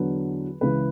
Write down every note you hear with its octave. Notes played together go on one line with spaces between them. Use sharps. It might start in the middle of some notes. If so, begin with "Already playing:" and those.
Already playing: E2 D3 F#3 B4
C#2 C#3 E3 B4